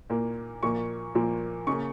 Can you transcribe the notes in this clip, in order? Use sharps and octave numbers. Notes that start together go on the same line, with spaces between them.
A#2 A#3
A#2 F3 A#3 C#6
A#2 F3 A#3
C#3 A#3 C#6